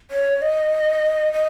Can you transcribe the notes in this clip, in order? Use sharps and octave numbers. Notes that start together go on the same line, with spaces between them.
C#5
D#5
D#5